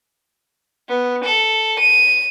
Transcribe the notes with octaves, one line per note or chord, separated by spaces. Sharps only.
B3
A4
D#7